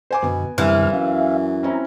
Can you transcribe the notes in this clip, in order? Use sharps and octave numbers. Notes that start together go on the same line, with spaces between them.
C5 G#5 D6
F#2 B2 D3 B3 G#5
C2 F#2 D3 E3 F6
F#2 E5 F5
C4 C#4 E4 A#5